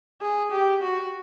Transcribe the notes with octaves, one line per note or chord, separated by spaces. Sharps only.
G#4
G4
F#4